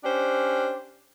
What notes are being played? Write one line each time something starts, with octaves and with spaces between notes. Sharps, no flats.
C#4 D4 G4 C5